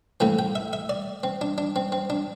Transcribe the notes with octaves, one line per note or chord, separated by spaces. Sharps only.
A2 E3 A3 C4 G5
G5
E5
E5
D5
C4
D4
D4
C4
C4
D4